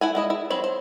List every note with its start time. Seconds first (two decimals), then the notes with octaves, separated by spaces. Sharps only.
0.01 E4 F#5 G#5
0.15 G#3 E4 D#5
0.30 E4
0.50 F#3 C4 B5
0.64 C5